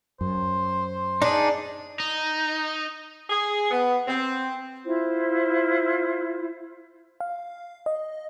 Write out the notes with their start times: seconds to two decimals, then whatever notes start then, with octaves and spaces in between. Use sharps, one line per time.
0.21 F#2 C5
1.22 D4 D#4 G#4
2.00 D#4
3.30 G#4
3.71 B3
4.08 C4
4.85 E4 F4 C5
7.20 F5
7.86 D#5